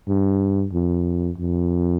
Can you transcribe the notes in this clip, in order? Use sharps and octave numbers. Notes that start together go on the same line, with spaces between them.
G2
F2
F2